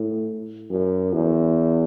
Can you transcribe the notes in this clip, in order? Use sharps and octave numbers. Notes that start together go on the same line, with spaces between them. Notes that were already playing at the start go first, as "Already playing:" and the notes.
Already playing: A2
F#2
E2